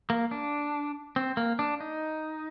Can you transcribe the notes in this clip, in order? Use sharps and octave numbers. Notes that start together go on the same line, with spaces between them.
A#3
D4
C4
A#3
D4
D#4